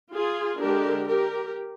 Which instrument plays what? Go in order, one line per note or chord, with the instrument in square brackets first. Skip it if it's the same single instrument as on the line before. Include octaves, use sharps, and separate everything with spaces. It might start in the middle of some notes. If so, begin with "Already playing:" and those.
[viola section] F4 G#4
D3 G#3 D4 G4 A#4
G4 A#4